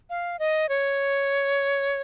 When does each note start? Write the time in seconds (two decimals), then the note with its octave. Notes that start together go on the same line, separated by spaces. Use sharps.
0.10 F5
0.39 D#5
0.69 C#5